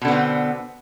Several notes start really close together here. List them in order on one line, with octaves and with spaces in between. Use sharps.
B2 D3 B3 C4